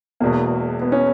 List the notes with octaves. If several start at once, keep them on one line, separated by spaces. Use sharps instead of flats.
E1 E2 B2 A#3
B3
C#4